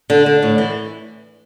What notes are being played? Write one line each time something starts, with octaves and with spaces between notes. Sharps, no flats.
D3
D3
A2
E3